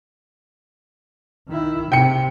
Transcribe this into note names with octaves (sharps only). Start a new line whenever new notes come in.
D#3 E4
C3 G5 C#7